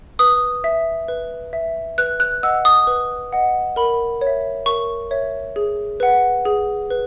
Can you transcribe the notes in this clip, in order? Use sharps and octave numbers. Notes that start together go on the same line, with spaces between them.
B4 D#6
E5
B4
E5
B4 F#6
F#6
D#5 F#5 E6
D#6
B4
D#5 F#5
A#4 B5
C#5
E5
A#4 C#6
C#5 E5
G#4
B4 F#5
G#4
B4